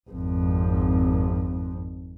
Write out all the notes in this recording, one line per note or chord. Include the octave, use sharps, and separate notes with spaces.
G#1 F2